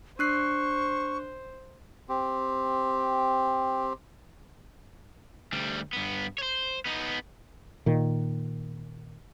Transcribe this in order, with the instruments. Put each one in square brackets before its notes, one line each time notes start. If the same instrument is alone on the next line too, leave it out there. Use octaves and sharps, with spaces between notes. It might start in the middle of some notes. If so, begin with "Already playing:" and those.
[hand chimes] D4 F#6 C7 [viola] C5 [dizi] C#6
[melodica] C4 G4
[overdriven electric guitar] D2 G3
G2 B3
C5 C#5
B3 D#4
[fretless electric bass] A#2 D#3